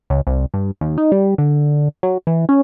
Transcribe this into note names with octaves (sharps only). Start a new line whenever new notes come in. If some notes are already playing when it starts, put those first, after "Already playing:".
C#2
C2
G2
D#2
D#4
G3
D3
F#3
E3
C#4